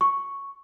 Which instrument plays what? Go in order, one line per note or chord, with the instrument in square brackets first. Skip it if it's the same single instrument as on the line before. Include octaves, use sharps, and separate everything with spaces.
[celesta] C#6